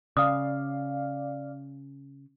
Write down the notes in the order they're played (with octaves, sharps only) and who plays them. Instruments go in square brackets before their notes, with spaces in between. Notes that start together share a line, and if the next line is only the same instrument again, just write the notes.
[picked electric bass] C#3 [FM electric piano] D5 F5 [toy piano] D#6